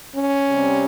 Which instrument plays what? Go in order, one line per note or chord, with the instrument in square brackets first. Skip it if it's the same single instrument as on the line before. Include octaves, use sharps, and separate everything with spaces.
[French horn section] C#4
C3 G3 C4